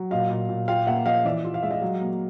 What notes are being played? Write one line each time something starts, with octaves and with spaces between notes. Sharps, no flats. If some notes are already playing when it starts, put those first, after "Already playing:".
Already playing: F#3
A#2 D#5 F5
A#2
A#2
F4 F5 G5
A#3 E5 F#5
F3 D#5 F5
E3 D5 E5
F4
F5
G#3 E5
D#5 F5
F#3
A#3